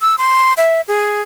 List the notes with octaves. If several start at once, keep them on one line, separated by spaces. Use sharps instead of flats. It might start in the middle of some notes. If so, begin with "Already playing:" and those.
E6
C6
E5
G#4